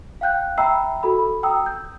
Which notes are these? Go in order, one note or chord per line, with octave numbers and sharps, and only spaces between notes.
F5 G5 F#6 G6
E5 G5 A#5 B5 E6 C7
F#4 A4 B5
G5 A#5 D#6 E6
G6